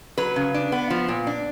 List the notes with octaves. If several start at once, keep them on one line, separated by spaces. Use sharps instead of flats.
F#3 B4
C#3
D4
B3
F3
A#2
D4